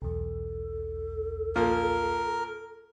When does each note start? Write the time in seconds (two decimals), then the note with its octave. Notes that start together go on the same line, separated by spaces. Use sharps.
0.02 B1 E2 A4
1.56 A#2 F3 A#3 A#4